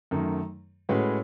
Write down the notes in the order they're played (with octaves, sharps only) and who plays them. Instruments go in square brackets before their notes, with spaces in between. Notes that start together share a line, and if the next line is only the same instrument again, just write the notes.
[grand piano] F#2 D#3 A3
A2 G#3 C#4 F#4 B4